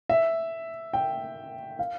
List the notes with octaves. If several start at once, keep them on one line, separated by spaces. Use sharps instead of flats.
E5
G5
F5